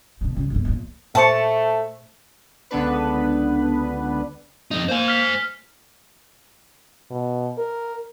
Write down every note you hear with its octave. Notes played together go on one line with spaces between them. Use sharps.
B2 D3
C#3 G#3
G1 D#2
E2 A#2
A#2 A3 C5 A5 C#6
C#2 D3 B3 D4 B4
F2 D#4
A#3 C5 G#5
F6 B6
B2
A#4